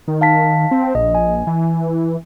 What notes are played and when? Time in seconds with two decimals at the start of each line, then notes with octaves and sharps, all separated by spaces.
0.08 D#3
0.21 F5 A5 B6
0.71 C4
0.95 A#1 D#5
1.15 G#5
1.47 E3